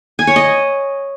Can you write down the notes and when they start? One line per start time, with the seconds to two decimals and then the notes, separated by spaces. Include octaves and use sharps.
0.19 G#5
0.27 C#5
0.36 D#5